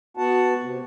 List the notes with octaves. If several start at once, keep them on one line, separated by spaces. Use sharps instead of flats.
B3 F#4 F#5 A5
C3